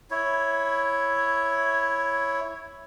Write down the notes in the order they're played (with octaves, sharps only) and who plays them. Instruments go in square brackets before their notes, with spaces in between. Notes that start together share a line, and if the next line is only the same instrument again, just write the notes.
[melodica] E4 C#5